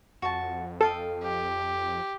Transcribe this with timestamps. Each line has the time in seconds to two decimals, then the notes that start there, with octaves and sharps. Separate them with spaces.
0.22 F2 F#4 A5
0.81 A4 D#5 F5 G5
1.23 G4